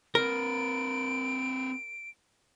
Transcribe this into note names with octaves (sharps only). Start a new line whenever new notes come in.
C4 A#4 B4 D7